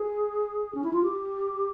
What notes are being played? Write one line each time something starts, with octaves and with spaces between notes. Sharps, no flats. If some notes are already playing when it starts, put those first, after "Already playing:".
Already playing: G#4
C#4
E4
F4
G4